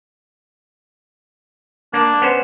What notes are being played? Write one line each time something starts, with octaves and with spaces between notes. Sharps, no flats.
A#3 D4
B3 C#4 C5